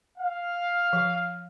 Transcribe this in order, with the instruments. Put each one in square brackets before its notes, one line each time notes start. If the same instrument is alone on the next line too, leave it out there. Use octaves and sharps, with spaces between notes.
[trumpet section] F5
[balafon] F3